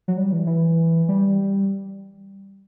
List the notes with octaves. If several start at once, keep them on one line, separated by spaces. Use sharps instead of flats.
F#3
G3
E3
E3
G3